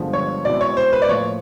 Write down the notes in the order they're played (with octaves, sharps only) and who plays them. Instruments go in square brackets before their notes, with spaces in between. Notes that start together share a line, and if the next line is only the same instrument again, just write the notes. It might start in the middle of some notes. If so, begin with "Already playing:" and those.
Already playing: [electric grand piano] G2 D3 F3 G#3 B3
[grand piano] C#5
[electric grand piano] B2 G#3 C4 E4 [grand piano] D5
[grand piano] C#5
C5
B4
D5
[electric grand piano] A2 F3 A#3 [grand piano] C#5